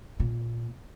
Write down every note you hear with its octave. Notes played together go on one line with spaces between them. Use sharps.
A#2